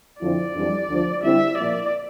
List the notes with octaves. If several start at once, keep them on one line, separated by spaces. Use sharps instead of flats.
F2 D3 F3 C4 E4 D5
F2 E3 G3 D4
D2 D3 F3
D3 G3 C4 E4 E5
A#2 F3 A#3 E4 D5